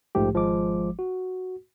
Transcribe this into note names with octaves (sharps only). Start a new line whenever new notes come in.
A#1 G#2 F3 A3 G4
G#1 F3 G#3 D6
F#4